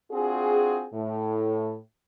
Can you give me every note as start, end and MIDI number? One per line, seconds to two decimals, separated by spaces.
0.12 0.85 60
0.12 0.85 62
0.12 0.85 65
0.12 0.85 66
0.12 0.85 68
0.93 1.76 45